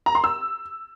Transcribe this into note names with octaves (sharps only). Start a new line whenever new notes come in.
A#5
C6
E6